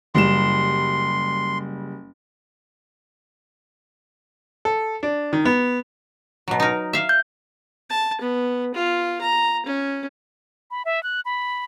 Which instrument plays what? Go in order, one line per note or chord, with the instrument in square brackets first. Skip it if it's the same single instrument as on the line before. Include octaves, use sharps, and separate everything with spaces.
[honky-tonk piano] F#1 G3 E7 [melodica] C6
[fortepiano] A4
D4
D#3
B3
[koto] B2 F#3
D#4 A#4
E5 F5
[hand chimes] G6
[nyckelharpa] A5
B3
F4
A#5
C#4
[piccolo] B5
E5
F#6
B5